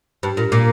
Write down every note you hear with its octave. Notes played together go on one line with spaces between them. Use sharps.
G2
A#2
A#2